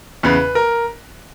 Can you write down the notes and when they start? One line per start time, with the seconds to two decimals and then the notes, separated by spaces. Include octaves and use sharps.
0.23 E2 C#3 B4
0.55 A#4